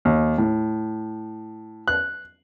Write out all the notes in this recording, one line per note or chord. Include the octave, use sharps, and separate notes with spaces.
D#2
A2
F#6